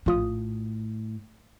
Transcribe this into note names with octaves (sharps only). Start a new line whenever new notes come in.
A#1 A2 F4 D#6